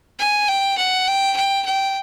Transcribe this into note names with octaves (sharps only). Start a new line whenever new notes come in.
G#5
G5
F#5
G5
G5
G5